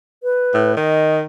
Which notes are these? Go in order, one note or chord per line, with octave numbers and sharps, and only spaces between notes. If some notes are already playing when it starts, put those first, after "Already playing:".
B4
A2
D#3 D#5